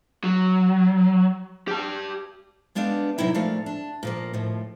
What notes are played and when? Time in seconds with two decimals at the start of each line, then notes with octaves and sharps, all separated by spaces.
0.24 F#3
1.68 G4 A5
2.75 G#3 B3 D4 G4 F5
3.18 E2 C3 F#3 D#4 E4 G5
3.34 A#2 F3 A3 D5 F5
3.66 D4
4.03 A#2 F3 A#3
4.33 D#2 A2 F3